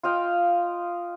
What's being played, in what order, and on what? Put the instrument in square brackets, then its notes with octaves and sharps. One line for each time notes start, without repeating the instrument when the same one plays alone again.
[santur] F4 D#5 F5 G5